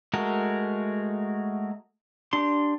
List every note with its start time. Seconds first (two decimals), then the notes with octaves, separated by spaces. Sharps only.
0.14 G#3 A3 F#4 A#4
2.33 D4 G4 C6